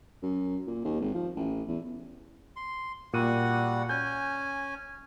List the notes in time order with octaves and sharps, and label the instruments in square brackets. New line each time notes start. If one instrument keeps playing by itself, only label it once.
[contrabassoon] F#2
A#2
D#2
G#1
F3
A1
E2
[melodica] C6
[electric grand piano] A#2 D#7 [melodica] G3 F#4 F#5
[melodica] C#4 G#5 [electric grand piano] G6